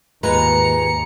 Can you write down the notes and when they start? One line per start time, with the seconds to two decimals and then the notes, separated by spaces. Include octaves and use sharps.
0.23 D#2 G#2 G#3 F4 B4 A#5 C#7